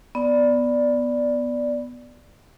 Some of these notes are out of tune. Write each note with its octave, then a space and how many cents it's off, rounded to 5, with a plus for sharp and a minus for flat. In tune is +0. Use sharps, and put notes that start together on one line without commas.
B3 +0 D5 +0